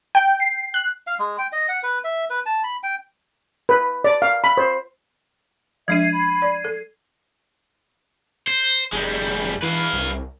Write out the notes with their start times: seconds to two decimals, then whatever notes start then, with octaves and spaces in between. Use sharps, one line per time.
0.15 G5
0.40 C7
0.74 F#6
1.07 F5
1.19 G#3
1.38 G5
1.53 D#5
1.69 F#5
1.83 B4
2.04 E5
2.30 B4
2.46 A5
2.64 B5
2.83 G5
3.69 B4
4.04 D5
4.22 F5
4.44 B5
4.57 C5
5.88 F3 G#3 D4 E5 G#6 C7 D#7
6.13 B5
6.42 D5
6.65 A4
8.48 C5
8.92 F1 G3 G#3
9.62 E3 B4 F5
9.93 C2